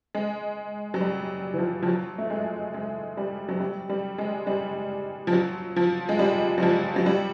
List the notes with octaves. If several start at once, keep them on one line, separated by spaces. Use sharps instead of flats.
G#3
F#3
G3
E3
F3
F3
F#3
A3
G#3
G#3
G3
F#3
G3
G3
G#3
G3
F3
F#3
F3
G#3
G3
F#3
F3
F#3
G3